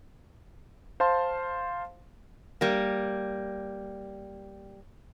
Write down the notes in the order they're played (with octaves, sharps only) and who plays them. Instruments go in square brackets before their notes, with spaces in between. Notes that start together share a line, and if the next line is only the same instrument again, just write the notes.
[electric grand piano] C5 F5 A5 C6
[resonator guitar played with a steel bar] G3 A#3